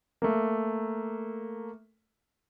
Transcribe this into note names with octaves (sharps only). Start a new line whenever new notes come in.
A3 A#3